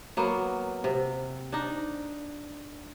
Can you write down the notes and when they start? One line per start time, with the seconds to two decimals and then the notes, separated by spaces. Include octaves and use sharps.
0.17 F#3 A#3 B3
0.84 C3
1.52 D4 D#4